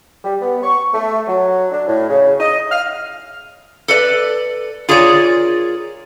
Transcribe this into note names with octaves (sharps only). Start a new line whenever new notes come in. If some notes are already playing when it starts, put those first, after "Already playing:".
G3
B3
C#6
A3
F#3
D4
A2
C#3
D#5
F6
A4 B4 D5
F4 G#4 A#4 C#5 D5